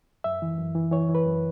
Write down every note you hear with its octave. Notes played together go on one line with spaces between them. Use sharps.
F#2 E5
E3
F#2
E3
E3 C#5
E3
B4
F#2